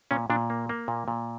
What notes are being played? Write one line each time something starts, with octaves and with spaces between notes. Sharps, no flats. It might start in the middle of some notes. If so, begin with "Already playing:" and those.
A#2 C#4
A#2 D4
A#3
A#3
A#2
A#2